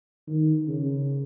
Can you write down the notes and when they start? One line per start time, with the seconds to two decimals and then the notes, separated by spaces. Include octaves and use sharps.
0.28 D#3
0.68 C#3